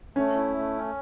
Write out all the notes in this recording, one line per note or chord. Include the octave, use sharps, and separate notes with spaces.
A3 C#4
E4
A3
C#4